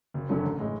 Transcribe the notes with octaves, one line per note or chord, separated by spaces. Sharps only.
F#1
F#2 D3 F#3 C#4
A1
A2 G#3